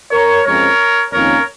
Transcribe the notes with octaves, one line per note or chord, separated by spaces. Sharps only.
A#4 C#5
F2 F3 G#3 C#4 A#4 C#5
F2 D#3 A#3 C#4 A#4 C#5